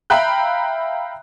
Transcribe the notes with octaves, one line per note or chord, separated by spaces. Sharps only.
E5 F5 G5 A#5 B5 F#6